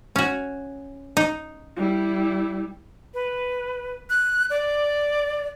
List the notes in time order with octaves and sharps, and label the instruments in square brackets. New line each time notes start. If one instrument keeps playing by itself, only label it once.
[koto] C#4 F#4
D#4
[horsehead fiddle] G3 E4
[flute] B4
F#6
D5